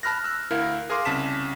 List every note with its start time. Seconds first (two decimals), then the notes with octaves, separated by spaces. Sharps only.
0.03 A5 B5 F6 F#6 A#6
0.24 E6 F#6
0.51 D2 E4 A#4 F5
0.90 G#4 A#4 F5 C6 D6
1.05 C2 C#3 A5 B6 E7